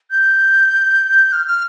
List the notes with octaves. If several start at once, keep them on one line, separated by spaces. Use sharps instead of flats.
G6
F6
F6